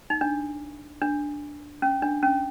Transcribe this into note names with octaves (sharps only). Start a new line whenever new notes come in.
D#4
D4
D4
C#4
D4
C#4